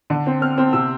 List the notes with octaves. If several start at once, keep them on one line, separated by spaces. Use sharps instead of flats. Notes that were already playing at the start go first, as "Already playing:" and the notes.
D3
C4
C4 F6
C4
C3 E6